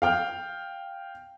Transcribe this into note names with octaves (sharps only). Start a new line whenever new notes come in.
F5 G5 F6